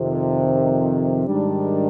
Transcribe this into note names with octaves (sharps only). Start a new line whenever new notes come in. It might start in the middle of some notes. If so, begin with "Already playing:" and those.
Already playing: F2 C3 D#3
G#2 D#3 G3 D4